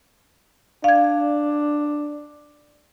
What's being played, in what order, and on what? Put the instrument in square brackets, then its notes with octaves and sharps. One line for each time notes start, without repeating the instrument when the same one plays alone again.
[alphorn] D4 [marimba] F5 G#6